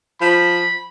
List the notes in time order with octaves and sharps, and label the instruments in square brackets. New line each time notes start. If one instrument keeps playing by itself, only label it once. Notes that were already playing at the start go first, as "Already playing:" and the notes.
[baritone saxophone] F3 [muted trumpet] B5